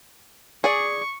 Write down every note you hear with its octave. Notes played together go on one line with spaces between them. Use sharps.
G#4 D5 C#6